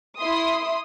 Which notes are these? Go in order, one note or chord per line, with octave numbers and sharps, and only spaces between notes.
E4 C6 D#6